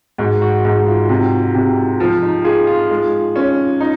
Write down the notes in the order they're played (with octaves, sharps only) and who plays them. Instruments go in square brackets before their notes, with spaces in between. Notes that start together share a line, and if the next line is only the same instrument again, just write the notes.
[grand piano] G#2 [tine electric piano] F#4
[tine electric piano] F#4
[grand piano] G#2 [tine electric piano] D#4
[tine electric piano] F4
[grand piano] C3
C3
F3
[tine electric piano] D#4
[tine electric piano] F4 [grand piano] G#4
[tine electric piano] F4
[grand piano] G#3
C#4
D#4